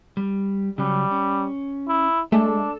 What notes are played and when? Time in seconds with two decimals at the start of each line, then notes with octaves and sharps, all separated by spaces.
0.17 G3
0.78 C#3 F#3 G3 C#4
1.11 C#4
1.88 E4
2.32 G#3 A3 D4 A4